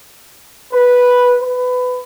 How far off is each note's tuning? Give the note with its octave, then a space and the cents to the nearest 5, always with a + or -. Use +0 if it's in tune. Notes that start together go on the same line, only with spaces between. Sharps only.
B4 -5
B4 +20